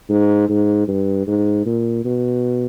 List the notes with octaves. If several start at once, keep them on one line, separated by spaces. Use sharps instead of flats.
G#2
G#2
G2
G#2
A#2
B2